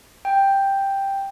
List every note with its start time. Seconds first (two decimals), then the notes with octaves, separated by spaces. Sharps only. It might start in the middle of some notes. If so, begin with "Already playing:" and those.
0.25 G5